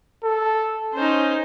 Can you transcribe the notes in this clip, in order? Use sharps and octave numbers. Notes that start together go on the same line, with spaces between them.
A4
C#4 D#4 C5